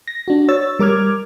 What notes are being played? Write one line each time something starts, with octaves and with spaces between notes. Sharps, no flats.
A#6
D4 F#4
C#5 E6 A6
G3 A#4 D6 F6 G#6